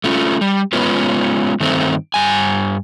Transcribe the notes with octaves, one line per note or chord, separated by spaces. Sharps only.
A3 C#4 F4
G3
G#3 B3 C#4 F4 B4
G2 D#3 A3 C4
G2 G#5